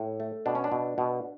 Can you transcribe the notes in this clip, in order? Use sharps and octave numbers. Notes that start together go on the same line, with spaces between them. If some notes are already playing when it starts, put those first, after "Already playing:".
Already playing: A2
A3
B2 D4
C#4
D4
B2
B2